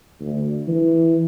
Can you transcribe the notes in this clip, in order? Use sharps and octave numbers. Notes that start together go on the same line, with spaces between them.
D2
E3